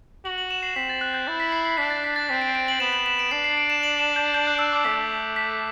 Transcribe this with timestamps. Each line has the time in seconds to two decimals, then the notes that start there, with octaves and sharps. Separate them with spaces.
0.25 F#4 F#7
0.38 F#7
0.51 E7
0.63 C7
0.76 C4 B6
0.89 A6
1.01 F#6
1.14 G6
1.27 E4 A6
1.40 B6
1.52 C7
1.65 C7
1.78 D4 B6
1.90 A6
2.04 B6
2.16 A6
2.29 C4 B6
2.42 D7
2.55 D7
2.68 F#7
2.80 B3 E7
2.93 F#7
3.06 E7
3.19 D7
3.31 D4 C7
3.44 C7
3.58 D7
3.70 E7
3.83 F#7
3.99 E7
4.16 G6
4.34 G6
4.47 F#6
4.59 E6
4.73 D6
4.84 A3 B6
5.36 B6